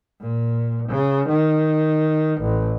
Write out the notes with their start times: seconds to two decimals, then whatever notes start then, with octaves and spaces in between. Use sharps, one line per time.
0.21 A#2
0.89 C#3
1.29 D#3
2.42 A1